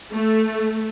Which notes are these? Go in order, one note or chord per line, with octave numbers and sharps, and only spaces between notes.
A3